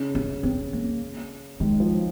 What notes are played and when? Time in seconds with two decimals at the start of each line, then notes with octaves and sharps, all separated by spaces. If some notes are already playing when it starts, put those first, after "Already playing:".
Already playing: C#3
0.15 C#4
0.43 C4
0.73 A#3
1.60 D#3 G#3
1.80 F3